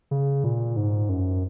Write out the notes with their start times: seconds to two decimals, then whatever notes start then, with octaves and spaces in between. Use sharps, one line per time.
0.11 C#3
0.44 A#2
0.76 G#2
1.09 F#2